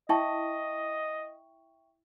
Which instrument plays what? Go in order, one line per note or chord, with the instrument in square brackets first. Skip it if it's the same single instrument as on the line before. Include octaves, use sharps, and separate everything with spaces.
[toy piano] E4 A5 [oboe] D#5 [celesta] E5 G5 C#6